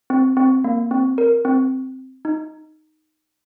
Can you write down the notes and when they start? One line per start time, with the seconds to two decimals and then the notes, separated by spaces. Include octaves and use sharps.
0.10 C4
0.37 C4
0.64 A#3
0.91 C4
1.18 A#4
1.45 C4
2.25 D#4